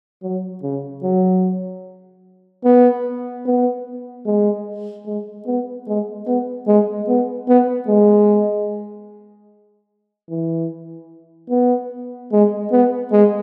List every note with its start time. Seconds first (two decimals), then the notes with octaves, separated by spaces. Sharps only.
0.22 F#3
0.63 C#3
1.03 F#3
2.64 B3
3.45 B3
4.26 G#3
5.06 G#3
5.46 B3
5.87 G#3
6.27 B3
6.67 G#3
7.08 B3
7.48 B3
7.88 G#3
10.30 E3
11.50 B3
12.32 G#3
12.72 B3
13.12 G#3